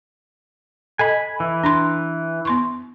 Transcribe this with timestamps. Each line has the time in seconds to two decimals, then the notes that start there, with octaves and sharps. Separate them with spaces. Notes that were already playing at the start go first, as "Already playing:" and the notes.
0.99 A4 D#5 G#5 B5
1.40 E3
1.63 D4 B5 C6
2.45 B3 C6 C#6